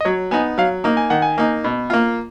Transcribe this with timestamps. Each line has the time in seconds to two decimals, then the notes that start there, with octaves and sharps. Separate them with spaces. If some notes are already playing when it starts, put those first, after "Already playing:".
0.01 D#5
0.05 F#3 C#5
0.31 B3 D#4 G#5
0.58 F#3 F5
0.84 A#3 D#4 A#5
0.97 G#5
1.10 D#3 F#5
1.22 G#5
1.38 A#3 D#4
1.64 B2
1.90 A#3 F4